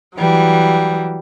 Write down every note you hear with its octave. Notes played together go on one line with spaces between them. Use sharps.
E3 F#3 G3